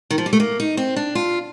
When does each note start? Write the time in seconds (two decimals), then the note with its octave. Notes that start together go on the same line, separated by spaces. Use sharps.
0.10 D#3
0.18 F3
0.26 G3
0.33 A3
0.40 A#3
0.60 D#4
0.77 C4
0.96 D4
1.15 F4